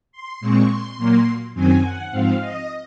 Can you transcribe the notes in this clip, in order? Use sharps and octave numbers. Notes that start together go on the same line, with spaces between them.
C6
A#2 G#3 C4 C#6
C6
A#2 F#3 A#3
F#2 D#3 F#3 C4 G#5
F#5
G#2 F3 C4 F5
D#5